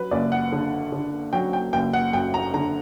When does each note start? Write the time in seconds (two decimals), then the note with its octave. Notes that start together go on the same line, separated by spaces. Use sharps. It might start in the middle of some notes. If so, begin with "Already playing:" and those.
Already playing: F#3 B4
0.11 F#1 D5
0.32 F#5
0.52 D3
0.92 D3
1.33 F#3 G5
1.53 G5
1.73 F#1 G5
1.93 F#5
2.13 F#2 G5
2.34 A#5
2.54 D3 A#5